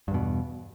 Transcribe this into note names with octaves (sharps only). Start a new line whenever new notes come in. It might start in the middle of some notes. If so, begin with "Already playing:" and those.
E2 G2 B2